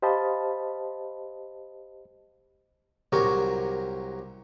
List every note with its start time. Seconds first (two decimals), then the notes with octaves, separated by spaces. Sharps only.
0.02 G4 C5 D#5 F5 A5 B5
3.12 C2 F#3 F#4 G4 A#4